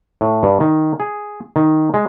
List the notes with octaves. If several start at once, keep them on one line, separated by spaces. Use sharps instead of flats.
A2
G2
D#3
G#4
D#3
G#3